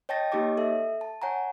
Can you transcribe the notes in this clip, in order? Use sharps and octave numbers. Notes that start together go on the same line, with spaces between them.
C#5 D#5 G5 A5 A6 A#6
A#3 D#4 G4 C#5 D#5 D6
A4 E5
A5
C#5 F#5 G#5 A#5